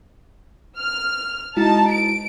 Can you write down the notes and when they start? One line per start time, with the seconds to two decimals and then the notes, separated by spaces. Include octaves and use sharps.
0.79 F6
1.57 G#3 D#4 E4 F#4 A5
1.89 D7